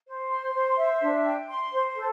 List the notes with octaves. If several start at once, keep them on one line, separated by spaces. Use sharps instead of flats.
C5
C6
C5
E5
D4
G5
C6
C5
A4